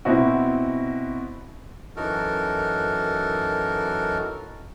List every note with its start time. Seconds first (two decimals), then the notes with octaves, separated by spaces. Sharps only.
0.05 B2 C4 E4 F#4
1.96 F#2 E3 D#4 F#4 A4 A#4